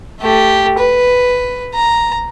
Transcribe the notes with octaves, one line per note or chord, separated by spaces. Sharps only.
A3 G4
B4
A#5